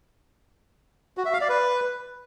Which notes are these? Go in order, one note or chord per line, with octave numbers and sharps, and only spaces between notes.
F#4
E5
F5
D5
B4